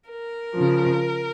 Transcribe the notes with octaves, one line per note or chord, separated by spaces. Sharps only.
A#4
C#3 F3